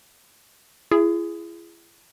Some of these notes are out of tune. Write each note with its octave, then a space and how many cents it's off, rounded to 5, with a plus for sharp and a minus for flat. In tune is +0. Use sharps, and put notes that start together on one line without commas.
E4 +40 G#4 +0